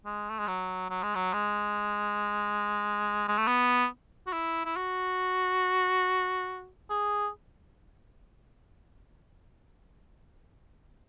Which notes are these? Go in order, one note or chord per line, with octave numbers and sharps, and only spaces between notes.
G#3
A3
G#3
F#3
F#3
G#3
F#3
G#3
G#3
A3
B3
F#4
E4
E4
F#4
G#4